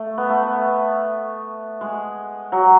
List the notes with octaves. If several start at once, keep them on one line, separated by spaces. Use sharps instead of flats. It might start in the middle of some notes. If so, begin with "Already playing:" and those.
Already playing: A3
B3
A3
B3
G#3
F#3